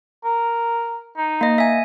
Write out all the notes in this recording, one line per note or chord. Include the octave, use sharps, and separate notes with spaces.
A#4
D#4
A#3 D#5
E5 G#5